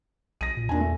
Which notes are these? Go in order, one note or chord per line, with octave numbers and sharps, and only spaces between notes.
B1 A#6 D#7
A#2
E2 A#2 D4 G#5
A3